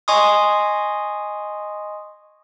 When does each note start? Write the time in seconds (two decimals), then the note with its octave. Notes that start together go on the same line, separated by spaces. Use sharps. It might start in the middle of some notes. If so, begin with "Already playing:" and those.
0.08 D#5 G#5 C6 C#6 D#6